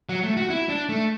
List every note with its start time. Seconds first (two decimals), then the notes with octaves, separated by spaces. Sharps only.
0.09 F#3
0.23 A3
0.37 F#4
0.50 E4
0.69 D4
0.89 A3